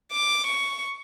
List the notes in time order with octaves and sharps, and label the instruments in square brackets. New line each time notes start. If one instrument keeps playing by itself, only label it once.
[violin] D6
C#6